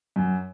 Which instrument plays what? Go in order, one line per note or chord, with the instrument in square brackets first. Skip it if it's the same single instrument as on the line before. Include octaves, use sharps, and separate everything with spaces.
[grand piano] F#2